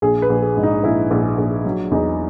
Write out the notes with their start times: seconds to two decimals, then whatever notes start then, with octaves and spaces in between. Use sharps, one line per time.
0.02 A#1 G#4
0.22 B4
0.30 A#1
0.42 G#4
0.57 G#2
0.63 D#4
0.83 A#1 E4
1.11 A#1
1.38 A#1
1.65 F#3
1.91 E2 D#4